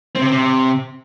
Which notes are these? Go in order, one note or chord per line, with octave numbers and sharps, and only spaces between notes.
C4
C3
C4
C3